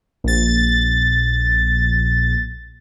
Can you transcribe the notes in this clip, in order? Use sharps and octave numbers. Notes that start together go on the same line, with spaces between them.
A#1 A6